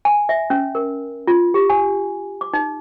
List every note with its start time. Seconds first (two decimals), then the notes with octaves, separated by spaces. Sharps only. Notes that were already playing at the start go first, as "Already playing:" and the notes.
0.05 G#5
0.29 E5
0.50 C#4
0.75 A#4
1.27 F4
1.54 G4
1.70 G#5
2.41 D6
2.53 D#4